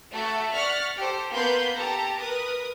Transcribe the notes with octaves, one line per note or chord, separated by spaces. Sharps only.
A3 F#4 A4 E5
D5 F#5 C#6 F6 A6 B6
G4 A4 C5
A#3 B3 B4 B5 C6 G6
G4 A4 A5 A#5
A#4 B4 D#6